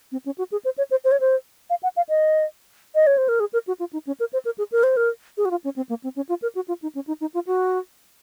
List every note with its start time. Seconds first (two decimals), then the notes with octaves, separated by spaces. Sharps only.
0.12 C4
0.26 C#4
0.38 F#4
0.52 G#4
0.65 C5
0.78 C#5
0.91 C5
1.04 C5
1.12 C#5
1.20 C5
1.70 F5
1.83 F#5
1.97 F5
2.09 D#5
2.95 D#5
3.07 C#5
3.18 C5
3.29 A#4
3.40 G#4
3.53 A#4
3.67 F#4
3.80 F4
3.93 D#4
4.07 C#4
4.20 A#4
4.33 C5
4.45 A#4
4.58 G#4
4.72 A#4
4.83 C5
4.97 A#4
5.37 G#4
5.45 F#4
5.51 F4
5.64 C#4
5.76 C4
5.89 A#3
6.04 C4
6.16 C#4
6.29 F4
6.42 A#4
6.55 F#4
6.68 F4
6.82 D#4
6.95 C#4
7.07 D#4
7.21 D#4
7.34 F4
7.47 F#4